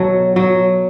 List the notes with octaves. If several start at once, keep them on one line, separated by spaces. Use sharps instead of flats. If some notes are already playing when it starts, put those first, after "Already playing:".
Already playing: B2 F#3 A4 C#5
F#3